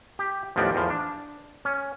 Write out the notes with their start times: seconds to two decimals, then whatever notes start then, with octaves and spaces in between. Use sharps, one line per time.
0.19 G4
0.56 A1 D#2 F3 B3 C4 D5
0.75 E2 F3
0.90 D4
1.65 C#4